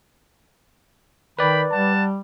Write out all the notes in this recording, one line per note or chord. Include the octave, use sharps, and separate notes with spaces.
D#3 B4 D5 G5 B5
G3 F#5 A5